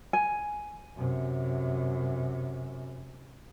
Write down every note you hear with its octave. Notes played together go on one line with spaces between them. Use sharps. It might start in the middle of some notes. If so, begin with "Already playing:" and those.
G#5
F#2 C3